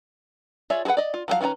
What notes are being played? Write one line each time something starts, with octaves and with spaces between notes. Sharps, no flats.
F4 G#4 C#5 D5 E5
F#4 G#4 A4 B4 F#5
D5 D#5
F4
F3 F#3 G#4 F5
D#3 C#4 F4 B4 A#5